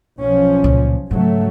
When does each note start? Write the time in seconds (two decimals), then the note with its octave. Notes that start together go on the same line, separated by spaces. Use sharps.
0.20 B1 F3 C#4
0.64 C#2 A#2
1.11 G#2 C#3 F#3 A3